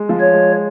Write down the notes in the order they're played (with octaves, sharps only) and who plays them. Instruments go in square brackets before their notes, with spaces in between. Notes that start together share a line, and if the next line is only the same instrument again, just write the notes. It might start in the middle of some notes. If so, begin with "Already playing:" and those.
Already playing: [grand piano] G#3
F3
[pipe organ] C#5
[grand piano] G#3